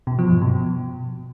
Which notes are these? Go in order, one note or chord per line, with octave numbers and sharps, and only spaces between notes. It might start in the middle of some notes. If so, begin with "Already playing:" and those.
B2
F3
G2
B2